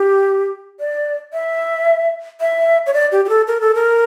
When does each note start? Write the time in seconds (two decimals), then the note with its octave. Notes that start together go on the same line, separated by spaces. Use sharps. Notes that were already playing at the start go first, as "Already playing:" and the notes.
Already playing: G4
0.80 D5
1.33 E5
2.40 E5
2.87 C#5
2.94 D5
3.12 G4
3.25 G4
3.29 A4
3.48 A#4
3.61 A4
3.75 A#4